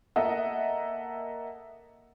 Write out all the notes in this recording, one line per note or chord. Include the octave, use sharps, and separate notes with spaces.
A#3 A4 D#5 E5 F#5